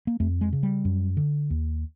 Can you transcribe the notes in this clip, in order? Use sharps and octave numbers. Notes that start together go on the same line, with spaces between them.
A#3
F2 A3
G#3
C#3
G3
F#2
D3
D#2